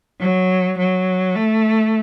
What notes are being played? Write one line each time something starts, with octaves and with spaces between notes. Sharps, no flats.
F#3
F#3
A3